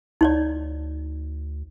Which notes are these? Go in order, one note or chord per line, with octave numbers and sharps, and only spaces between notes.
D2 D#4 C#5 D5